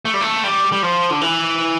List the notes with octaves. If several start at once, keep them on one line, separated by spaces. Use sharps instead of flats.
A3
G3
A3
G3
G3
F3
D3
E3